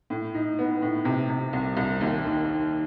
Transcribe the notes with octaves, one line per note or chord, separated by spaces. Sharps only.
A2
D#4
B3
A2
C3
C3
C2
C2
D#2
D#3